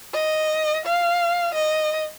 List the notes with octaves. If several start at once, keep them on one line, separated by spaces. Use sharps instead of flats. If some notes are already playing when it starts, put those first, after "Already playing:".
D#5
F5
D#5